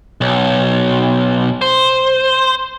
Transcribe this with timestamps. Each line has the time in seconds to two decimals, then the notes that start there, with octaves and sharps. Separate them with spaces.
0.21 B1
1.62 C5